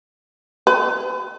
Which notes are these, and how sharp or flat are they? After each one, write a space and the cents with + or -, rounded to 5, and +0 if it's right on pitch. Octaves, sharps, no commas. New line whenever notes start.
B4 +45